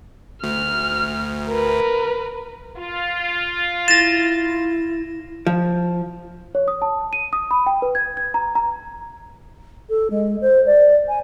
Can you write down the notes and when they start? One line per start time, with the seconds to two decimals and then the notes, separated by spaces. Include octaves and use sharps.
0.44 D2 F6
1.48 A#4 B4
2.77 F4
3.88 E4 A6 A#6 E7
5.47 F3
6.55 C#5
6.68 D#6
6.82 A5
7.13 D#7
7.33 D#6
7.51 B5
7.66 G5
7.82 B4
7.95 G#6
8.17 G#6
8.34 A#5
8.55 A#5
9.89 A4
10.10 G#3
10.41 C5
10.66 D5
11.08 G#5